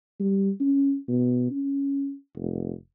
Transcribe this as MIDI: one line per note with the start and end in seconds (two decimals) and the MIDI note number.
0.20 0.51 55
0.60 0.96 61
1.08 1.47 47
1.51 2.14 61
2.36 2.73 29